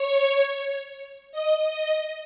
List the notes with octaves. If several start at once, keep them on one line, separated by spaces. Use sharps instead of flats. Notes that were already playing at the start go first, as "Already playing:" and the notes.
Already playing: C#5
D#5
D#5